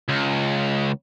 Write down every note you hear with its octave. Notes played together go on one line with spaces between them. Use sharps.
C#2